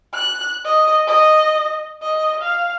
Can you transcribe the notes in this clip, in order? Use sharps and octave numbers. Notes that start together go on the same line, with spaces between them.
F#6
D#5
D#5
D#5
F5